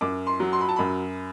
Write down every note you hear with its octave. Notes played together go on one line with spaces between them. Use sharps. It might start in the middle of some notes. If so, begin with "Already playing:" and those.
F#2 D6
C6
F#3
C6
B5
A5
F#2 B5